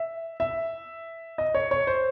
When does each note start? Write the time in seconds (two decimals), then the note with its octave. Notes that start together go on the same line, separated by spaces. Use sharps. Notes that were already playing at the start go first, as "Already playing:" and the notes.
Already playing: E5
0.40 E5
1.38 D#5
1.55 C#5
1.71 C#5
1.87 C5